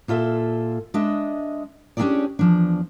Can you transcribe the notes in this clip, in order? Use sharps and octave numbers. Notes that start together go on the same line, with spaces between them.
A#2 F4 A4 E5
G#3 D4 D#5 E5
C#4 D4 F4 G4 G#4 D5
E2 F3 D4